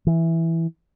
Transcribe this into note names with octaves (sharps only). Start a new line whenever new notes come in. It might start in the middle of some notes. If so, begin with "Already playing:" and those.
E3